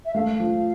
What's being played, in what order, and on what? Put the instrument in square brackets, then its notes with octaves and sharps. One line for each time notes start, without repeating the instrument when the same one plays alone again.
[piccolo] E5
[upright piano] A3 [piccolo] F5
[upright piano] F3